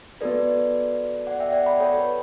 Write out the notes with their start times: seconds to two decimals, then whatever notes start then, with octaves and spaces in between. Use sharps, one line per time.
0.21 B3 F#4 A4 B4 D5
1.27 D5 F#5
1.40 E5 G5
1.53 D5 F#5
1.66 G5 B5
1.80 A4 C#5
1.98 B4